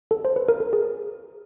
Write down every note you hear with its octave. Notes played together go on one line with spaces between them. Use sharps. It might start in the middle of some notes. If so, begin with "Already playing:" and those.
A4
C5
B4
A#4
A4
G#4